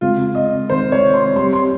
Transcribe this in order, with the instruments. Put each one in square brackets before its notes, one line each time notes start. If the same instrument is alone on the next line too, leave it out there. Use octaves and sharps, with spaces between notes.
[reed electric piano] C#3 G#3 C4 [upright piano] F4
[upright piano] D#5
[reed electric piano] C3 D#3 G#3 C4 [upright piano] C5
[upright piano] C#5
C6
[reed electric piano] G3 C4 G4 [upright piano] C6
[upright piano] C6